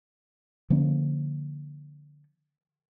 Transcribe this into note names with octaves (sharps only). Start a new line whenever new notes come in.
D3 F3 A#3 C#4